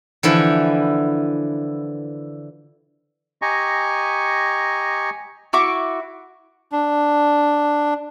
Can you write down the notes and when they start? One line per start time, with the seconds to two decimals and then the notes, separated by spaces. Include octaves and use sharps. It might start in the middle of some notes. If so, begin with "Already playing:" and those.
0.23 D3 E3 F3 E4
3.42 G4 D#5 G#5 A#5 C#6
5.53 E4 F#4 C#6 D6
6.72 D4